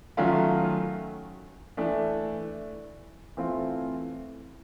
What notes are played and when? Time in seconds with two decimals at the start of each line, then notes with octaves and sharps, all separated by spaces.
0.17 D#3 F#3 A3 C#4 F4
1.77 E3 A3 D4
3.37 E3 A3 C4 F4